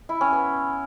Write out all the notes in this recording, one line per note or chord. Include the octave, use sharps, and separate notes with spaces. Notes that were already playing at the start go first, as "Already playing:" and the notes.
E4
C#4
B3